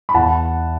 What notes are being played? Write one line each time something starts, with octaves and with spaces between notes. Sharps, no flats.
B5
E2 F#5 A5